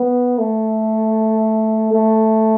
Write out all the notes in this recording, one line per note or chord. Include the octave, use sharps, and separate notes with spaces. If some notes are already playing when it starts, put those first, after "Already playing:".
Already playing: B3
A3
A3